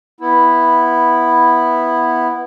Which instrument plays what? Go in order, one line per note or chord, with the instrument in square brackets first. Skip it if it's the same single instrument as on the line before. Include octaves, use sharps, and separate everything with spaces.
[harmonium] B3 E4